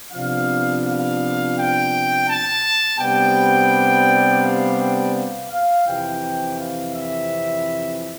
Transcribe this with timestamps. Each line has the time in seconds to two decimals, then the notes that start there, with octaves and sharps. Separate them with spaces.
0.12 C3 F3 B3 D4 F5
0.84 F5
1.57 G5
2.27 A5
2.99 C3 G3 B3 D4 G5
4.43 F5
4.79 G5
5.14 F5
5.51 F5
5.87 F2 C3 E3 G5
6.58 F5
6.95 E5